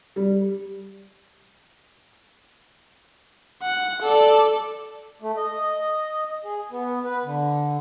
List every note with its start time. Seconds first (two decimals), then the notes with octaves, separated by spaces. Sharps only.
0.16 G3
3.62 F#5
4.02 A4 D5
5.22 A3
5.37 D#5
6.45 G#4
6.71 B3
7.04 B4
7.25 D3